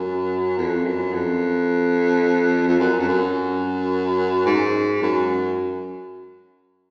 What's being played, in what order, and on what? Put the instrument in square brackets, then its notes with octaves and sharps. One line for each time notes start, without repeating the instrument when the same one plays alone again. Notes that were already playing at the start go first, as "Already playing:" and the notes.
Already playing: [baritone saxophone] F#2
F2
F#2
F2
F2
F#2
F2
F#2
G#2
F#2